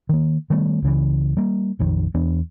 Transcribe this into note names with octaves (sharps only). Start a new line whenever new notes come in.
D#3 A#3
D#3 G3 A3 B3
C#2 C#3 E3
G3 A#3
A#1 F2 D#3
E2 E3 B3 D4